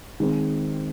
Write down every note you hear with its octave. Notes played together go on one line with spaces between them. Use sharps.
D#3 G#3 C4